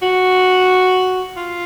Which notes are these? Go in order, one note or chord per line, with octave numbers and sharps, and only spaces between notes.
F#4
F4